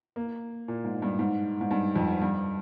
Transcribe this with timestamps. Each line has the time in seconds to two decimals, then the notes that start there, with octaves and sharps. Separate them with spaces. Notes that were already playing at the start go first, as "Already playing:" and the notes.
0.16 A#3
0.68 A#2
0.85 G#2
1.02 G2
1.19 G#2
1.61 G#2
1.71 G2
1.96 F2
2.21 G2